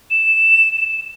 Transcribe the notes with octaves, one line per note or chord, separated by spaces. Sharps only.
E7
E7